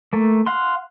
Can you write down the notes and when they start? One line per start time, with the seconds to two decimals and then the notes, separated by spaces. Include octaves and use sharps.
0.13 A3 A#3
0.46 F5 F#5 C6